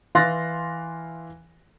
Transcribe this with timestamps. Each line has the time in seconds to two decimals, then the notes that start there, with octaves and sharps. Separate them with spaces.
0.15 E3 F5 C6 F#6 A6 A#6